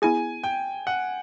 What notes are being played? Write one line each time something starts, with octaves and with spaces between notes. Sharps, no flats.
B3 E4 G#4 G#5
G5
F#5